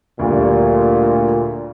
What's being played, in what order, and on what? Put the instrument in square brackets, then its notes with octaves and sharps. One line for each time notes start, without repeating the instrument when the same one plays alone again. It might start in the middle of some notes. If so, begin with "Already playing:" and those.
[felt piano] D2 G3 [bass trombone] A#2